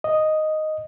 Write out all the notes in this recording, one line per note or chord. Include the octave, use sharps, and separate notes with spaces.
D#5